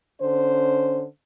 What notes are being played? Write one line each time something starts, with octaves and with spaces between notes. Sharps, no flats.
D3 C#4 C5